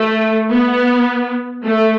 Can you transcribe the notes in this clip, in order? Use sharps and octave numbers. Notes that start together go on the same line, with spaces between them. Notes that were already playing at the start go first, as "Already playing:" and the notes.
Already playing: A3
B3
A3